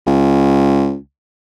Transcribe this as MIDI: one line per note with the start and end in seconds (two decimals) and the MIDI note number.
0.07 0.96 37